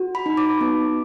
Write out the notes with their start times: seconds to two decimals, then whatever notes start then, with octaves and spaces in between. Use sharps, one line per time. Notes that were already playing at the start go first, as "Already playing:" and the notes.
Already playing: F#4
0.15 B5
0.26 D#4
0.37 D6
0.61 B3